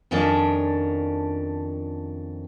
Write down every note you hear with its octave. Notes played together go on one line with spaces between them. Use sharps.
F2 D#3 F3 C#4 D4 D5